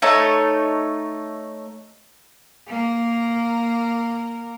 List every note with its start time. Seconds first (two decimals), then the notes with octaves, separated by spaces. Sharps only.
0.02 A3 D#4 C#5 A5
2.67 A#3 A#4